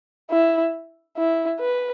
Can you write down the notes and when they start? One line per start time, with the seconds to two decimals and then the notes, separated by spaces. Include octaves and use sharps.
0.30 E4
1.17 E4
1.60 B4